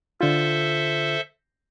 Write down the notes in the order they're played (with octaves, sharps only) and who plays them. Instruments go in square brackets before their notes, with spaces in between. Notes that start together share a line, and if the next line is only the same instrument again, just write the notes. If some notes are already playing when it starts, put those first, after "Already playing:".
[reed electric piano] D3 F4 [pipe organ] A4 C5 E5